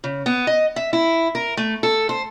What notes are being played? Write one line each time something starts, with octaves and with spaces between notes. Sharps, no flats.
C#3
B3
D#5
E5
E4
A#4
A3
A4
C5